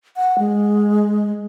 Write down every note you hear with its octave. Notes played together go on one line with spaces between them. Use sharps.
F#5
G#3